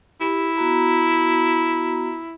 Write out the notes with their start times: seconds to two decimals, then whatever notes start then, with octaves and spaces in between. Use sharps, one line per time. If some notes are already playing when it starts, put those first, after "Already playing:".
0.21 E4 G4
0.57 B3 F#4 A#5